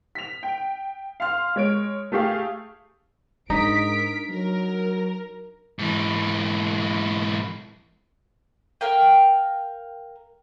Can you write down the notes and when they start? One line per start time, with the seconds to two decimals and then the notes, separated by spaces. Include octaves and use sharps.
0.15 B6 F7
0.43 G5
1.20 F5 C6 F6
1.56 G#3 C#5 D7
2.12 A3 G4 G#4 F5
3.50 G#2 D4 D#4 A#4 B6 D7
4.30 F#3 A#4
5.79 G#2 E3
8.81 A#4 F5 G5